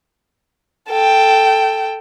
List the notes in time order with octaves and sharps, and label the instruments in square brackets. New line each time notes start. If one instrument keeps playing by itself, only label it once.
[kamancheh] A4 G5